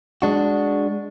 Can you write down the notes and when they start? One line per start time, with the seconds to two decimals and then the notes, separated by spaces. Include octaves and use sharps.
0.22 G#3 D4 F#4